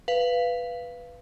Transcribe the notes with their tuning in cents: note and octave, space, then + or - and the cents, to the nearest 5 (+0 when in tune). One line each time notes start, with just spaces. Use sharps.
B4 +0 F5 -15